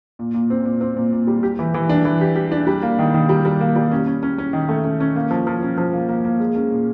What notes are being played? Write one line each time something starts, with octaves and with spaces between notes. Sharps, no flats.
A#2
A#2
C4
A#2
C4
A#2
A#2
G3
G4
E3
E3
D4
E3
G4
G4
D4
G3
A#3
D#3
D#3
G3
G3
A#3
G3
C#4
C#4
C#4
C#4
D#3
A3
C#4
C#4
A#3
F3
F3
C#4
F3
A#3
A#3
A#3
G#3
C#4
A#2